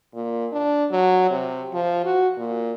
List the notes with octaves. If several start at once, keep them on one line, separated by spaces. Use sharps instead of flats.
A#2
D4
F#3
C3
F3
F#4
A#2